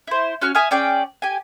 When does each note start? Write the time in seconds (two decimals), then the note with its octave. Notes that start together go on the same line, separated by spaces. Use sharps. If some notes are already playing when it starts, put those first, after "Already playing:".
0.07 E4 C5
0.42 C#4 F#4 F6
0.55 E5 G#5 D#6 F6
0.71 C#4 G#4 D5 G5
1.22 G4 G#5